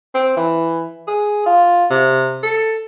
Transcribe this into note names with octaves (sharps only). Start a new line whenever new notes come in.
C4
E3
G#4
F4
C3
A4